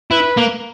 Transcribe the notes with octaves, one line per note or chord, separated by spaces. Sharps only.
E4 B4
A#3